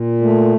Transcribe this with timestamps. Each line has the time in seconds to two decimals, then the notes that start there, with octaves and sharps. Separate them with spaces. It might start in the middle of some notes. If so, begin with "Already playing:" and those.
Already playing: A#2
0.21 A3